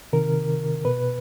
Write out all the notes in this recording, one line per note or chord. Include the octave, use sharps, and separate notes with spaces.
C3 D#3 A#4
B2 B4